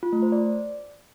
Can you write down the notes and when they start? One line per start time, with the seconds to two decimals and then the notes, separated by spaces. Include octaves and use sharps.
0.03 F4
0.13 A3
0.22 C5
0.32 D5